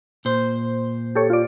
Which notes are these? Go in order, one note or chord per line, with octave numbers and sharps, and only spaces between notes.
A#2 C5
G4 A4 C#5
F4 D5